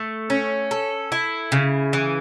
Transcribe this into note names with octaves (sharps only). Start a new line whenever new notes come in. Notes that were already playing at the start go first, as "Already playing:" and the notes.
Already playing: A3
C#4
A4
E4
C#3
E3